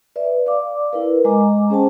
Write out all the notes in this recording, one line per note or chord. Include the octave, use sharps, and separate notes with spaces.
B4 D5 E5
D5 F5 D6
E4 A#4 B4
G#3 D#5 G#5 A#5 D6
C#4 G#4 C5 G5 A5